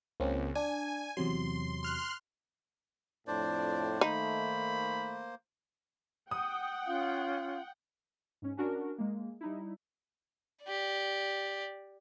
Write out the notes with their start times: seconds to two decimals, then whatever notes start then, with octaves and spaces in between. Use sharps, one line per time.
0.20 C#2 A#3 C4 C#4
0.55 D4 G#5
1.17 E2 C3 F#3 C6
1.83 C6 F6 F#6
3.27 F2 A2 D4 C5 D5
4.01 D#3 A3 A#3 D#4 C5 B5
6.31 F#5 G5 D#6
6.86 C#4 F4 F5
8.42 G#2 C#4
8.57 C#4 D4 F#4 A#4
8.98 G#3 A#3
9.41 G3 D#4 E4
10.64 G4 D5